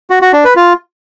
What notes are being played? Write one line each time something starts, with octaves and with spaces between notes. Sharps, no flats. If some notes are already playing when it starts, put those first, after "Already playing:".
F#4
F#4
D4
B4
F4